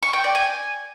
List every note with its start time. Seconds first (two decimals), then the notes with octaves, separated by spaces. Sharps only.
0.03 C#6
0.13 G5
0.24 D5
0.35 G#5